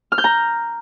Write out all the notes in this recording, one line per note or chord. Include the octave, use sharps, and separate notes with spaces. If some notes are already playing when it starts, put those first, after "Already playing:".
F6
G6
A#5